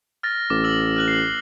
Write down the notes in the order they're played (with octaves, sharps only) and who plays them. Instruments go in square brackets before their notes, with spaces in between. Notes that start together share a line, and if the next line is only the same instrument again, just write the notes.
[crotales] F6 A6 A#6
[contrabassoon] A1 [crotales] D6
[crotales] E6 A#6 F#7
F6 F#6 F#7
C7